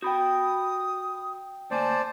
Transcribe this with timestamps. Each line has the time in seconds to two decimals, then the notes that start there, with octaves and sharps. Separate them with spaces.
0.02 F#4 G5 B5 D#6 G6
1.71 D2 A#3 C5 D5 G#5 A5